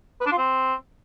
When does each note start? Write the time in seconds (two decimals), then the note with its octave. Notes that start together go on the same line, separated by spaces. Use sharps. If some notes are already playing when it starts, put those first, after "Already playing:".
0.21 B4
0.26 D4
0.32 F4
0.38 C4